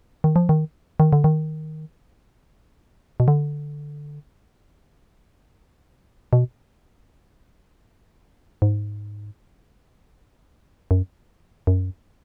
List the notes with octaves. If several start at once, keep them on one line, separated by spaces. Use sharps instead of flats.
D#3
F3
D#3
D#3
D3
D#3
B2
D3
B2
G#2
F#2
F#2